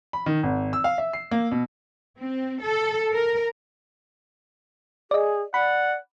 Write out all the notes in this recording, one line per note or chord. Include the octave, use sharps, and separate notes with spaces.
B5
D#3
G#1
E6
F5
E5
C7
A#3
B2
C4
A4
A#4
G#4 D5 D#5
D5 F#5 B5